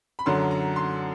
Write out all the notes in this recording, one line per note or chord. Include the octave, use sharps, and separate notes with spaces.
B5
F#2 D3 F#3 C6
A#5
C6